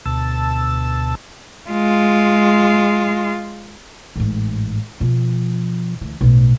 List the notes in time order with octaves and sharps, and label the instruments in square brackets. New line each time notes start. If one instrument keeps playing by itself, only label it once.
[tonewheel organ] D2 B2 A5 E6
[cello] G#3 F4
[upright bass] A1 G#2
B2 F3
D2 E3
B1 A2